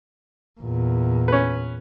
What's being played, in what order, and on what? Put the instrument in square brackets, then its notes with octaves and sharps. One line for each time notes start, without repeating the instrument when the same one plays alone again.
[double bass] E2 A#2
[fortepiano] C#4 B4